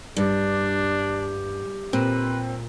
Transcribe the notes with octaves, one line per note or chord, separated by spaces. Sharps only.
G2 D4 G4
A#2 C4 B4